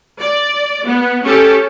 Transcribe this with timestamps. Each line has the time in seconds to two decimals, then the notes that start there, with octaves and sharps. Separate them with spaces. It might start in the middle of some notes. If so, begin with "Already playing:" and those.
0.20 D5
0.86 B3
1.23 C#4 G4 A4